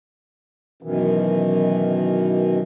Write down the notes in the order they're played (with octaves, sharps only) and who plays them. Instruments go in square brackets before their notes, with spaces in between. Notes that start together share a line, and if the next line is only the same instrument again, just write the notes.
[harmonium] F#2 B2 D#3 E3